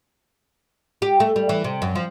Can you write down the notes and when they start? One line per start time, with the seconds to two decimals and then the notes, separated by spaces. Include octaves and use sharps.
1.02 G4
1.20 A3
1.36 G3
1.49 E3
1.64 C3
1.82 F#2
1.96 F3